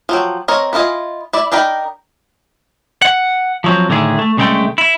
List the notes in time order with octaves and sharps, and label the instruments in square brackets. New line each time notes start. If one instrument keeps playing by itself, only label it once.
[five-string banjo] F3 F#3 G5
C4 A#4 C#5 D#5
B3 E4 F4 D#5 G#5
E4 D5 E5
D4 D#4 A#4 G5 B5
[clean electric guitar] F#5
F3 F#3 C4
A2 D3 D#3 E4 G#4
A3
C2 C#3 G#3 A3 G5
E4